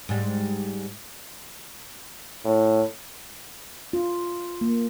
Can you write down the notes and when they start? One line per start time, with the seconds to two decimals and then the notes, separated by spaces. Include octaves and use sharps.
0.09 G#2 G3
2.45 A2
3.93 F4
4.61 A#3